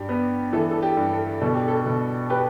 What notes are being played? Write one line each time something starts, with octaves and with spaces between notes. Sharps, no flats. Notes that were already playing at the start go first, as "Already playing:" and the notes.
Already playing: G2 G4
B3
E3 A4
A4
G4
G2
A4
B2 A4
G4
A4
B2
G4 B4